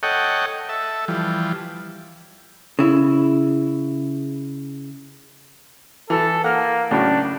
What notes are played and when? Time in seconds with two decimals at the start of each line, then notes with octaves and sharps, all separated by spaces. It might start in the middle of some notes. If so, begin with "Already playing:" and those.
0.03 A4 C#5 D#5 F#5 G5
0.69 A4 E5
1.08 E3 F3 G3
2.79 C#3 E4
6.10 E3 A4
6.44 A#3 F#5 F6
6.91 A2 C#3 F#3 D4